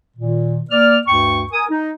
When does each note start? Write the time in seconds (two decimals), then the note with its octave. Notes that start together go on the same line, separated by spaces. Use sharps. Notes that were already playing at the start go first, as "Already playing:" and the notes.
0.17 A#2 D#3
0.71 A#3 D5 F6
1.07 D2 G2 G5 C#6
1.52 A#4 G#5 D#6
1.70 D#4